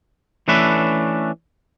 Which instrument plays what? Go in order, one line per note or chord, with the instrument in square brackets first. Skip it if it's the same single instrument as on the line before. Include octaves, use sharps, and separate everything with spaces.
[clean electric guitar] E3 A3 C#4 D4 B4 E5